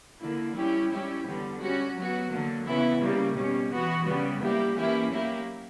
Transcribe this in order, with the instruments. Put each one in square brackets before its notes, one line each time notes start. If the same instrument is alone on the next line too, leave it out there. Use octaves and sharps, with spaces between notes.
[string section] D3 A#3 E4
G3 C#4 E4 G4
G3 C#4 E4 G4
D3 G3 B3
G3 C#4 F#4
F#3 B3 F#4
D3 F#3 A#3
C#3 E3 B3 E4
C#3 G3 A#3
B2 G3 C#4
E3 B3 F#4
C#3 G3 B3
G3 A#3 E4 G4
E3 A#3 C#4 E4 G4
F#3 A#3 E4 G4